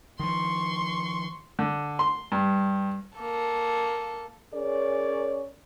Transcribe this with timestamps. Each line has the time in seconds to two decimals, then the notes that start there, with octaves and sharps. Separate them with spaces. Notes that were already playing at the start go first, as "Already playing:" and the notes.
0.19 D#3 F3 C6 C#6
1.59 D3
1.99 C6
2.32 G2
3.18 A#3 A4
4.54 C#4 G#4 A#4 C#5 D5